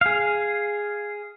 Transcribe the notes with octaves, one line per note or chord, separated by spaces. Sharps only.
G#4 F5